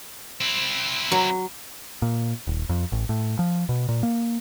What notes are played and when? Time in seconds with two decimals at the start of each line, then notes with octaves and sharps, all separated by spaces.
0.41 C4 E4
1.12 F#3
2.02 A#2
2.47 D#1
2.69 F2
2.92 A1
3.09 A2
3.39 F3
3.69 B2
3.89 A#2
4.03 A#3